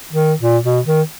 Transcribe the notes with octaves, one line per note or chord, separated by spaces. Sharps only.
D#3
A#2
B2
D#3